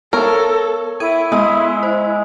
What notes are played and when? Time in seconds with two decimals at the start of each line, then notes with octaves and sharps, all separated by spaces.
0.13 B3 A4 A#4 C#5
1.00 E4 A4 G#6 D#7
1.32 G#3 B3 E6
1.83 C5